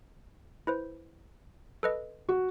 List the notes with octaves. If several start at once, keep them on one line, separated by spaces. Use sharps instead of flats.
E4 B4 C5
A4 B4 D#5
F#4